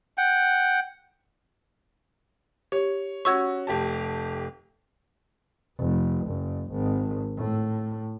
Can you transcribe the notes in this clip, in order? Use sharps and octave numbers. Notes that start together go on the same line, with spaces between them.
F#5 G5
G4 C#5
C#4 F#4 C#6 E6 G#6
F1 G4 A5
F1
F#1
G#1
A2